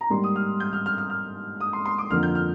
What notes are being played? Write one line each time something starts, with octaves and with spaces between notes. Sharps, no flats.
A#5
G#2 G3 A#3 C6
D#6
F6
G6
F6
F6
F6
F6
D#6
C6
C6
D6
F2 D3 F3 A#3 F6
G6
F6